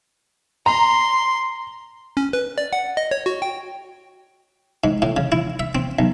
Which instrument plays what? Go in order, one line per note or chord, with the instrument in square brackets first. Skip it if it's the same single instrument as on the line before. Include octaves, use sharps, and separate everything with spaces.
[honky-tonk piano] A#5 [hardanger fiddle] C6
[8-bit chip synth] C#4
B4
D5
F#5
D#5
C#5
F#4
G5
[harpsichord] G#2
A2
C#3
E4
E5
C4
B1